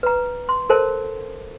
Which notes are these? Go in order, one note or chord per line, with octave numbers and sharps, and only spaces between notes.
B4 A#5
C6
A4 A#4 C5 A5